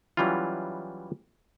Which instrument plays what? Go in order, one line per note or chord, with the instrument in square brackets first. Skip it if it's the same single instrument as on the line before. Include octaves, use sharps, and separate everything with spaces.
[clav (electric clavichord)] E3 F#3 G3 C#4 E4 F4